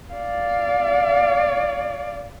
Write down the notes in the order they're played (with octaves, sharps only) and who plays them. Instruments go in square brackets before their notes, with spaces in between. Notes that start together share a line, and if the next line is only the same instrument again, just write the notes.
[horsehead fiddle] D5 F5